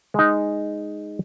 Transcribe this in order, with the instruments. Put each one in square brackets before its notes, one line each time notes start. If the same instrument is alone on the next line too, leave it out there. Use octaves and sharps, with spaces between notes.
[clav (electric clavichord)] G#3 D#4